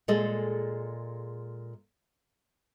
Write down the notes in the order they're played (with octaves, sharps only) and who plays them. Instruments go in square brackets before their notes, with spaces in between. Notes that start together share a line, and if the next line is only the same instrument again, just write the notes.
[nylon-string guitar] A#2 G#3 G#4 A4 D#5